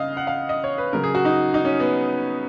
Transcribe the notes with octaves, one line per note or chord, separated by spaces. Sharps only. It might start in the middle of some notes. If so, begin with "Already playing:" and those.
Already playing: C#3 D#5 F5
F#5
F5
D#5
C#5
B4
C#3 F#3 A#4
G#4
F#4
D#4
D#4
C#4
B3